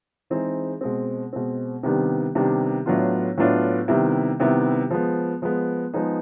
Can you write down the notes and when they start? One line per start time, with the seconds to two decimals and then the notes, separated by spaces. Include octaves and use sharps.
0.30 E3 G#3 C4 D#4 G#4
0.81 B2 G#3 C4
1.33 B2 G#3 C4
1.83 C3 D#3 G3 B3 D4
2.35 C3 D#3 G3 B3 D4
2.86 A2 F#3 B3 D4 F4
3.38 A2 F#3 B3 D4 F4
3.88 C3 D#3 G3 B3 E4
4.39 C3 D#3 G3 B3 E4
4.91 F3 G#3 B3
5.42 F3 G#3 B3
5.94 F3 G#3 B3 D#4 G#4